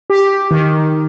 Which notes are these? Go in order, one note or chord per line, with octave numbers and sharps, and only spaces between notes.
G4
D#3